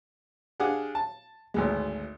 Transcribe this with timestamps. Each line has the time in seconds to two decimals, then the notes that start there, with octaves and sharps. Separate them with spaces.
0.60 D4 G4 G#4 F5 F#5
0.95 A5
1.54 G#1 D2 G#3